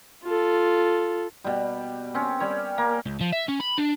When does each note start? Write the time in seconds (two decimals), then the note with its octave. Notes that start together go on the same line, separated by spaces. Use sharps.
0.23 F4 A4
1.44 B2 G3
2.14 C4 C#4
2.40 G3 C#5
2.78 A#3
3.06 C#2
3.21 F3
3.32 E5
3.48 C#4
3.60 B5
3.78 D4